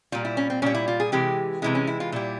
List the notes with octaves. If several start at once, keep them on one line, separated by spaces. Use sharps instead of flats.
A#2 G3 F4
E4
C#4
C4
A#2 G3 C#4
E4
F4
G#4
C3 E3 G#3 G4
C3 E3 G#3 E4
C#4
E4
F4
A#2 G3 E4